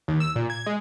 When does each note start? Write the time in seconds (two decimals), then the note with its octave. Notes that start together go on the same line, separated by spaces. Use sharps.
0.08 D#2
0.20 E6
0.36 A#2
0.50 G#6
0.66 G#3